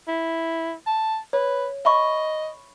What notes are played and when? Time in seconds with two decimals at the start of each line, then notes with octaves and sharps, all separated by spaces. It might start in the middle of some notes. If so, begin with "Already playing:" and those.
0.08 E4
0.87 A5
1.33 B4 C#5
1.85 D#5 E5 B5 C#6